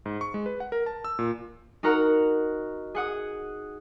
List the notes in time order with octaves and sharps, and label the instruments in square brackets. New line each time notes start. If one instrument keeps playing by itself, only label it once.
[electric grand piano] G#2
C#6
G#3
B4
F#5
A#4
A5
E6
A#2
[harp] D#4 F#4 A#4 F#5 A#5
G#4 F#5 D#6